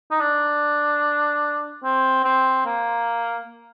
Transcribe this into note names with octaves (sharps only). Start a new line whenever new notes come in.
D#4
D4
C4
C4
A#3